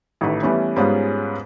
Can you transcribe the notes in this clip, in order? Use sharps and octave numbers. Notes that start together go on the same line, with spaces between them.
A1 D#3 A3 B4
E3 G3 A3 B3 C#4
G#2 G3 G#3 B3 C#4 F4